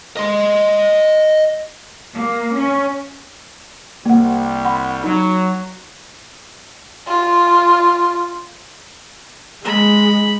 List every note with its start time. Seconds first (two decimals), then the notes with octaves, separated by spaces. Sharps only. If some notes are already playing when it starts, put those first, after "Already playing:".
0.17 D#5 C6
2.16 A#3
2.58 C#4
4.06 C2 G3 A#3 F#5
4.65 F#5 B5 C6
5.04 F#3 D#4
7.07 F4
9.65 G#3 B5